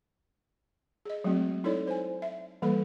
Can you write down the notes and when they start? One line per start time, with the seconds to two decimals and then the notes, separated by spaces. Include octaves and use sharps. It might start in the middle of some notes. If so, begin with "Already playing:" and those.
1.06 G#4 D#5
1.24 F#3 G#3 A3 C4 F#4
1.64 D#4 E4 A4 C#5 D5
1.87 C5 G#5
2.22 E5
2.62 E3 G3 A#3 A4 B4 B5